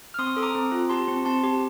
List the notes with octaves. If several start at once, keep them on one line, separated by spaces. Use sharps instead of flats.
F6
C4 C6 D#6
A4 D#6
A#5 D6
C4
F4
G4 A5 C6
C4
C4 A5 C6
G4